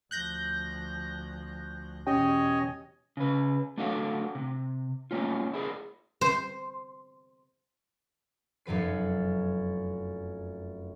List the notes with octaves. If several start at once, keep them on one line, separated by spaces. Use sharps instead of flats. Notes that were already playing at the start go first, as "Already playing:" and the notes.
D2 F3 F#6 G6 A#6
E2 B2 C#4 G4 C#5 D#5 G5 G#5
C#3 B4
A3 D4 F#4 G4 A4 F5
C3
G3 A3 A#3 C#4 F4
E4 G#4 A#4 C5
C5
F1 F#2 F#3 B4 C7